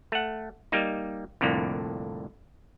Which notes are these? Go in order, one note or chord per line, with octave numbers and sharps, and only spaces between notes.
A3 F#5
G3 A#3 D#4
C2 F2 A2 D3 A#3